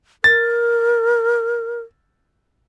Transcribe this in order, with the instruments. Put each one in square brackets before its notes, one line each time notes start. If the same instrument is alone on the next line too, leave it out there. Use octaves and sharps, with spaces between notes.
[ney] A#4 [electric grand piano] A6